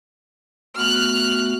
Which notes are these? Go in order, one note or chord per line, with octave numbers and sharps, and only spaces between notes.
A3 B3 F#4 F6 F#6